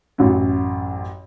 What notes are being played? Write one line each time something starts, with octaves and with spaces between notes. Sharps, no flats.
A1 F#2